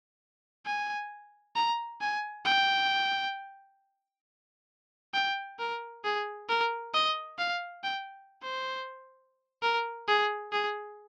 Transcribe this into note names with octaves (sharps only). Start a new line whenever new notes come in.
G#5
A#5
G#5
G5
G5
A#4
G#4
A#4
D#5
F5
G5
C5
A#4
G#4
G#4